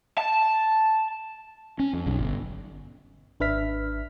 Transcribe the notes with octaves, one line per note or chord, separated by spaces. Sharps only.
A5
C#4
F2
B1
G1
G#1 D4 B4 E5 F6 B6